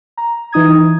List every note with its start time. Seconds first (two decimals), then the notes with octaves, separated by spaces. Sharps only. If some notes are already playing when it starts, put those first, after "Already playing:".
0.17 A#5
0.52 E3 D#4 D#6 G#6